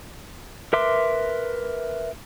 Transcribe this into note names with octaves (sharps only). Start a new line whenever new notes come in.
A#4 B4 E5 C6 D6